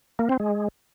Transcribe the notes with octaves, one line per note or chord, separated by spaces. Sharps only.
A#3
C4
G#3